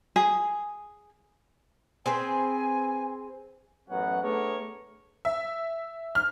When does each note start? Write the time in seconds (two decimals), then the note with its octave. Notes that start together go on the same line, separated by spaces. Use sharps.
0.16 G#4
2.06 C4 G#4 B4 G#5
3.89 A1 F#2 F#3 B3 C#4 F#5
4.22 A3 B3 D4 G#4 A#4 C#5
5.25 E5
6.15 F6